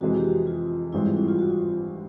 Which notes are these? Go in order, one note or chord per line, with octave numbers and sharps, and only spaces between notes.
F2 C3 E3 G#3 F#4
G4
F#4
F4
G#1 G2 E3 G#3 C4 E4
F4
E4
F4
F#4
F4